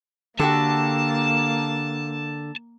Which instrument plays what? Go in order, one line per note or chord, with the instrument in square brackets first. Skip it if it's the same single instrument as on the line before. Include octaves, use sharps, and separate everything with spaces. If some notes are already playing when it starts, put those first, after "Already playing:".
[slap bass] D3 [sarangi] A#3 [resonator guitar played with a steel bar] F#4 G4 A4 [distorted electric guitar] A5